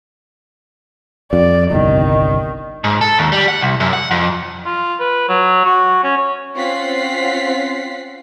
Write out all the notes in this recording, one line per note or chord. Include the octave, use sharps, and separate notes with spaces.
F2 D5
G1 C2 D#3
G#2
A4
D#2
G3
F#5
C2
F#2
F#5
F2
F4
B4
F#3
F#4
C#4
C#5
C4 C#4 F4 F#5 B6 C7